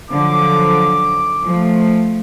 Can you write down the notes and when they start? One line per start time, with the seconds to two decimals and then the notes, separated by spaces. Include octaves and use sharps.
0.10 D3 F3 F#3 D6
1.43 F3 A3